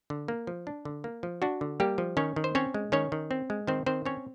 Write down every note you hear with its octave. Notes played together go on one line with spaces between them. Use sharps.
D3
A#3
F3
D4
D3
A#3
F3
D4 F#4
D3
G3 A#3 G4
F3
D#3 C#4 C#5
D#3
C5
C4 C#4 C#5
G#3
D#3 C#4 C#5
D#3
C4
G#3
D#3 C4 C5
D#3 C4 C5
C4 C#4 C#5